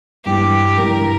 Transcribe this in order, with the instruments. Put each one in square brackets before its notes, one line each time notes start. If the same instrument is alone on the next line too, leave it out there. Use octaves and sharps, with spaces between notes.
[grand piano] G2 E3 G3 [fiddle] G4
[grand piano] G2 E3 G3 [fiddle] A#4